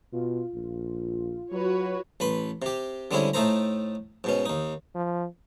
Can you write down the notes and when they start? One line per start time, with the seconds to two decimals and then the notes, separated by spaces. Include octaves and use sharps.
0.13 B2 F4
0.55 A#1
1.52 F#3 F#4 B4 C#5
2.20 A1 B4 B5 C6
2.62 C3 G4
3.11 D3 G3 G#3 C4 C#4 E4
3.34 A2 A3 D#4 A4 C5 A#5
4.24 G#2 B2 C#4
4.46 D#2 D#4
4.95 F3